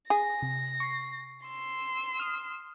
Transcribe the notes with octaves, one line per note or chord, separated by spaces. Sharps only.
G#4 A#6
C3
C#6 C7
C6 E6
D#6 F6